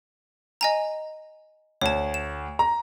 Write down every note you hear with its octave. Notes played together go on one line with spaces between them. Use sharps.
D#5 G#5 A#5
D2 C#5 A5
E7
A#5